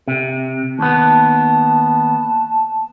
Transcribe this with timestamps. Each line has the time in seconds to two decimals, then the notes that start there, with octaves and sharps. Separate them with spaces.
0.08 C3
0.79 D#2 B3 A5